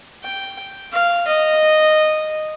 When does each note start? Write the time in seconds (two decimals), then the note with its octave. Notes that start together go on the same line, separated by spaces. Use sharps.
0.24 G5
0.92 F5
1.28 D#5